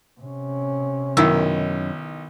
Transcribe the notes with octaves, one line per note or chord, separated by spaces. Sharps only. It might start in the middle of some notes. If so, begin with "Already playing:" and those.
C3 C#4
B1 F#2 D#3 E4 E6